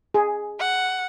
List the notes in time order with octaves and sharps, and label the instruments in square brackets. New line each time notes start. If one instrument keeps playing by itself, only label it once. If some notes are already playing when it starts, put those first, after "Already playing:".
[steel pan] G#4
[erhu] F#5